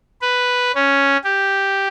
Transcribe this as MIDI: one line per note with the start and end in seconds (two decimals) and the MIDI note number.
0.22 0.72 71
0.75 1.17 61
1.24 1.88 67